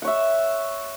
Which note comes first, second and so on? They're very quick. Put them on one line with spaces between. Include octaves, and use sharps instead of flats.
F#5 C#5 E5